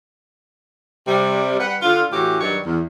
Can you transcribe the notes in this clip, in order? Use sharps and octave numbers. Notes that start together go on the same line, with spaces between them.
C3 G3
G3 B4 F#5
D3 F4
A2 E3 C#4 F#4 G4
G2 D#3 F#3 G3 C#5
E2